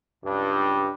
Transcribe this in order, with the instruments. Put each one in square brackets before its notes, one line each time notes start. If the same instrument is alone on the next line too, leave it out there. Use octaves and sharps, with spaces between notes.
[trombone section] C#2 G2